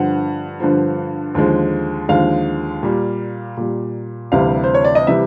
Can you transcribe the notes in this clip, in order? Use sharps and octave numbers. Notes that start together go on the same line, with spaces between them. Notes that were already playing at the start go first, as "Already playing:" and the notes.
Already playing: G2 D3 F3 F#5
G2 D3 F3
D#2 D3 F3 G#3
D#2 D3 F3 G#3 F5
A#2 G3
A#2 G3
D2 C3 E3 G3 F5
C5
C#5
D5
D#5
C3 E3 G3 E5